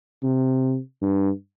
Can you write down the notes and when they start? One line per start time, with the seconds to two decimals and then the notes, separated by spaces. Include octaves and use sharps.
0.23 C3
1.02 G2